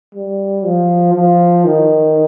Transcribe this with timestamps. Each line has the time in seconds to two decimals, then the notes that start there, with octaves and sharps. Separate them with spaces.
0.15 G3
0.65 F3
1.14 F3
1.65 D#3